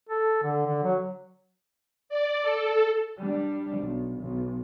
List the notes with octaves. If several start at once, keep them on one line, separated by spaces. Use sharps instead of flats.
A4
D3
D3
F#3
D5
A4
G3 D4
B1
B1